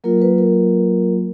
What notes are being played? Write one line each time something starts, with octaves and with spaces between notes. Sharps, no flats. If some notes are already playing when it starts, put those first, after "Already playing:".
F#3 A#3 F4 A#4
B4
A#4